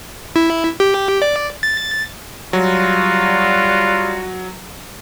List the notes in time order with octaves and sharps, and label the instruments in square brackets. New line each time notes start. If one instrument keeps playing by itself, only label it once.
[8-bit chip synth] E4
G4
D5
A6
[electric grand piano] F#3 [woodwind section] G3 F#4 [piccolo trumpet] F4